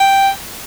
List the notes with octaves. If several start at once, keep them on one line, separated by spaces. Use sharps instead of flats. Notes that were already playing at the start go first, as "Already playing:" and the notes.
Already playing: G5